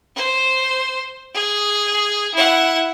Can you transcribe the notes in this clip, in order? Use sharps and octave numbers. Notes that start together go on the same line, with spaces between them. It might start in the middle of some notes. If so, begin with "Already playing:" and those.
C5
G#4
E4 F#5